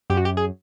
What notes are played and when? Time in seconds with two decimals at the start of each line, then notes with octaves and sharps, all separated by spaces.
0.10 F#2 G4
0.17 F#4
0.25 G4
0.37 G#4